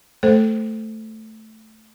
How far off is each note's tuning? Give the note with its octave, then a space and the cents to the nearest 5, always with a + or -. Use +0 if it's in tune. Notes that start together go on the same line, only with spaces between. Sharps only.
A3 +0 A4 +0 C5 +0